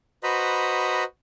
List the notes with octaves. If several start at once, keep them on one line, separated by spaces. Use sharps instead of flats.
F#4 B4 C5 D#5 A#5 B5